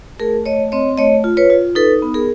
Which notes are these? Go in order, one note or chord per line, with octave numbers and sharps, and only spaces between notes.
A3 G#4 A#4
A3 C#5 D#5
C4 C#5 D#5
A3 C#5 D#5
F4
B4 C#5
F4
D#4 A4 B4
B3
G#4 A#4